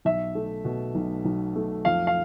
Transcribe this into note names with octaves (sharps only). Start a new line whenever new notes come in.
B1 E5
A3
B2
B1
B1
A3
F2 F5
F5